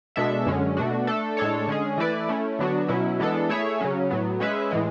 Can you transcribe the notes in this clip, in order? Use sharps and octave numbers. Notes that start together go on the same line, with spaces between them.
B2 G#3 D4 A4 E5
F#2 D3 G#3 C#4
B2 A3 D4 F#4
A3 D4 A4
A2 G#3 D4 A4 C#5
D3 G#3 C#4 G#4
E3 A3 E4 B4 D5
A3 C#4 E4
D3 F#3 B3 D4 F#4
B2 F#3 C#4 E4
E3 G#3 B3 D4 A4
A3 E4 G#4 C#5 E5
C#3 F#3 C#4
A2 F#3 B3
G#3 C#4 G#4 B4 E5
A2 E3 G#3